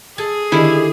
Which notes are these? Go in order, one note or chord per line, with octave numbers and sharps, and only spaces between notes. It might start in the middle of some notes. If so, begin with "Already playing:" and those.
G#4 A4 G#5
D3 D#3 E4 G4